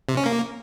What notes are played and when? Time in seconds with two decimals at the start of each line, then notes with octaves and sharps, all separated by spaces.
0.09 C3
0.17 C#4
0.26 A#3